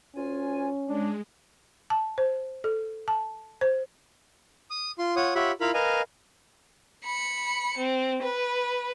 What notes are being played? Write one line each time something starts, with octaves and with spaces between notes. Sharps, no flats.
D2 C#4 F4 G#5
G#3 D4
A5
C5
A4
A5
C5
D#6
F4 C6
F4 C#5 F#5 D#6
F4 G4 C#5 E5 F#5 B5
E4 F4 A#4 F5 B5
A#4 B4 D#5 F5 G#5
B5 C#7
C4
B4